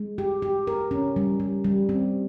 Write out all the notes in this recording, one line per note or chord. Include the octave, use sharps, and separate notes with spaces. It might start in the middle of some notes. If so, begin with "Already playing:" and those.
Already playing: G#3
G4
G4
A#4
C#4
G3
G3
G3
C4